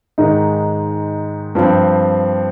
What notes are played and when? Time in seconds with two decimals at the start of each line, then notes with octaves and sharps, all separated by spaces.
0.18 G#2 D#3 G#3 D#4
1.55 G2 F3 C4